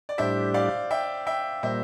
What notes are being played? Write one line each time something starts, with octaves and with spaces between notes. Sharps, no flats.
D5
A2 G3 D4 G4 C5 E5
D5 F5
E5 G5
E5 G5
A#2 G3 A#3 C5 E5